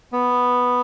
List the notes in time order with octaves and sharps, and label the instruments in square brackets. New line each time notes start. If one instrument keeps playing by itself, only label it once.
[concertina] B3